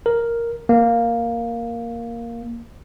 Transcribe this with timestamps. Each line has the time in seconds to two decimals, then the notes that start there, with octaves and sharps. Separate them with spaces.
0.06 A#4
0.69 A#3